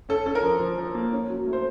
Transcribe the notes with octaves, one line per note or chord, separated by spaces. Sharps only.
C#4 A4
C#4 A4
A#4
F3
F3
F3
A#3
C#4
F#3
A3
C5